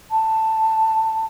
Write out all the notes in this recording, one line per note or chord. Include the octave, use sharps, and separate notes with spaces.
A5